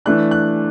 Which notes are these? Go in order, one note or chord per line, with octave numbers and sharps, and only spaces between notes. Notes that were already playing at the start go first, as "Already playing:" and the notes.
E3 A3 D4 F#6
F#6